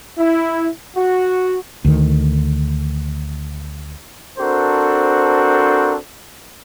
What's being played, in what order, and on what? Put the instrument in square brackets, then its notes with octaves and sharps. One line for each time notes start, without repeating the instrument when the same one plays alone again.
[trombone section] E4
F#4
[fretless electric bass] D2 D#3
[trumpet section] C4 D4 F#4 A4 A#4 C5